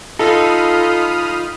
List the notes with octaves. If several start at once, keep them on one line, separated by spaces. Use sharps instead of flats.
D#4 F4 A4 B5 D#6 F6